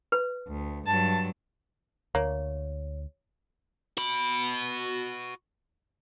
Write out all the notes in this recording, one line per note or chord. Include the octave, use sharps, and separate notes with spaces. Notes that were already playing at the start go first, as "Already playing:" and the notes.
B4
D2
G2 F#3 A5
D2 A#3 C#5
F#4 B5